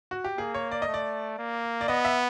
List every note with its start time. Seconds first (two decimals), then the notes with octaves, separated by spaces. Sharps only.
0.11 F#4
0.24 G4
0.38 A#3 G#4
0.54 C#5
0.71 D5
0.82 D#5
0.88 A3
0.94 D5
1.39 A#3
1.81 D5
1.88 B3 D#5
2.05 E5